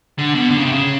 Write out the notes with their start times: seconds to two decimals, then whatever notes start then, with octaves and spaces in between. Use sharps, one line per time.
0.19 D3
0.35 B2
0.50 D3
0.58 C#3
0.65 C3
0.72 C#3